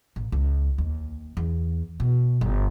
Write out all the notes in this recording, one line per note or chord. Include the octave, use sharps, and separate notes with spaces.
A1
C#2
D#2
E2
B2
G1